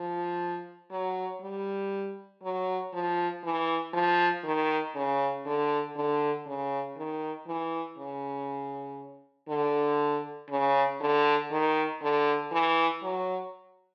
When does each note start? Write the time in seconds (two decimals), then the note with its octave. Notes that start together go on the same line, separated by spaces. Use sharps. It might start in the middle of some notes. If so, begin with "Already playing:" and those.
Already playing: F3
0.91 F#3
1.41 G3
2.43 F#3
2.93 F3
3.44 E3
3.94 F3
4.44 D#3
4.95 C#3
5.46 D3
5.96 D3
6.46 C#3
6.97 D#3
7.47 E3
7.98 C#3
9.49 D3
10.50 C#3
11.01 D3
11.51 D#3
12.02 D3
12.52 E3
13.03 F#3